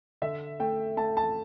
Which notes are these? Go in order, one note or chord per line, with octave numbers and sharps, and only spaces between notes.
D3 E5
A3 G5
A3 A5
A5